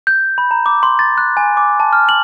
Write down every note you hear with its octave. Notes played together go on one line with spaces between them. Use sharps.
G6
B5
A#5
D6
C6
A6
F#6
G#5
D6
A5
F6
F#7